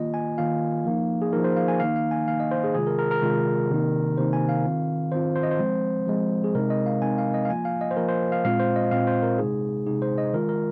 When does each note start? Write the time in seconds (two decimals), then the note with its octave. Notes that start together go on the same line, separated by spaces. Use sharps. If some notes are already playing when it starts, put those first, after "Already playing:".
Already playing: D#3 A#3 F4 D#5
0.14 G#5
0.38 D#3 A#3 F4 F5
0.85 F3 A#3 D#4
1.22 G#4
1.33 F3 A#3 D#4 A#4
1.44 C5
1.57 F5
1.68 G#5
1.80 D#3 A#3 D#4 F5
1.96 F5
2.11 G#5
2.28 D#3 A#3 D#4 F5
2.40 D#5
2.51 C5
2.64 G#4
2.75 C3 D#3 G#3 F4 G#4
2.87 A#4
2.99 A#4
3.11 A#4
3.22 C3 D#3 G#3 F4
3.70 C3 D#3 A#3 D#4
4.18 C3 D#3 A#3 D#4 C5
4.33 G#5
4.49 F5
4.65 D#3 C4 F4
5.12 D#3 C4 F4 C5
5.35 C5
5.43 D#5
5.51 C5
5.59 F3 G#3 C4
6.07 F3 G#3 C4
6.44 G#4
6.54 C3 G#3 C4 D#4 A#4
6.70 D#5
6.86 F5
7.01 C3 G#3 C4 D#4 G#5
7.18 F5
7.34 D#5
7.45 F5
7.49 F3 A#3 F4 G#5
7.65 F5
7.81 D#5
7.91 C5
7.97 F3 A#3 F4 A#4
8.09 C5
8.32 F5
8.44 A#2 G#3 C4 F4 F5
8.60 C5
8.76 D#5
8.91 A#2 G#3 C4 F4 F5
9.07 C5
9.23 A#4
9.38 C3 G#3 D#4 G#4
9.86 C3 G#3 D#4 G#4
10.02 C5
10.18 D#5
10.33 D#3 G#3 F4 A#4
10.49 A#4